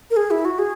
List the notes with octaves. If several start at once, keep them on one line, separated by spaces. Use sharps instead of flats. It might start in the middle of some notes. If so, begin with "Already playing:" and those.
A#4
G#4
E4
F#4
G#4